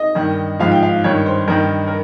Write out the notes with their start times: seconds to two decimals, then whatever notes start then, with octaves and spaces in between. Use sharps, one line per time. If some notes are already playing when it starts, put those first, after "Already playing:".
Already playing: D#5
0.15 G2 D#3
0.59 G#2 F3 F5
0.72 G5
0.83 F5
1.04 G2 D#3 C#5
1.26 C5
1.48 G2 D#3 A#4
1.88 A#4